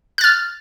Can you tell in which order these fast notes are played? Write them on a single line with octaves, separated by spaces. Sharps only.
F#6 A6 F6